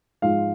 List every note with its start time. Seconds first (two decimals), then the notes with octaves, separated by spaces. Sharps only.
0.22 G#2 F3 G#3 F5